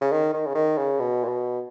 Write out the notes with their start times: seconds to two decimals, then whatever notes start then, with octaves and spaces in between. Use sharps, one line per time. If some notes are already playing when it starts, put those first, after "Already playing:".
0.01 C#3
0.12 D#3
0.34 D#3
0.46 C#3
0.55 D#3
0.77 C#3
0.99 B2
1.23 A#2
1.28 B2